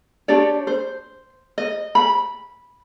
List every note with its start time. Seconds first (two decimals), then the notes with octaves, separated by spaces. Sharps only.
0.28 D4 G4 C#5 D5
0.67 C5
1.58 D#5
1.95 B5